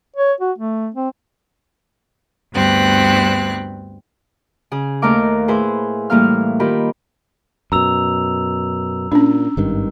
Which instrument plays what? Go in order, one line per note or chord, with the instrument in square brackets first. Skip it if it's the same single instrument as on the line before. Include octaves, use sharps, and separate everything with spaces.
[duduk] C#5
F#4
A3
C4
[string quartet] D2 G2 B3 C4 F#6
[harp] C#3 G#4
D#2 D#3 A3 A#4 F5 D6
A2 E4 G#4 B4 C5 G#5
A2 E3 G3 A#3 F5 F6
D#3 F4 G4 A#4 B5
[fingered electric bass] F#2 B2 [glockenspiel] A#5 E6 F7
[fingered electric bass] A#2 [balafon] C#4 D4
[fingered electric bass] G#1 G2 D#3